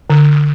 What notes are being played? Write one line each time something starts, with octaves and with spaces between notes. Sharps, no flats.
D3